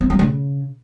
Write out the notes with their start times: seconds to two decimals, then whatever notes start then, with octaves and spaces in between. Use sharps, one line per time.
0.01 C4
0.10 F#3
0.19 C#3